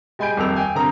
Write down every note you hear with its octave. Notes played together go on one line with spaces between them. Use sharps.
G3 G#3 G#5 B5 G6 D7
D#1 F2 A#4 E6 F7
G5 G#5
G2 D3 C4 A#4 A#5 D#6